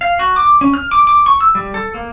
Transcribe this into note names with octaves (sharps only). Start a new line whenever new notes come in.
F5
F#4
D6
C#4
F6
D6
D6
C#6
E6
G3
A4
A#3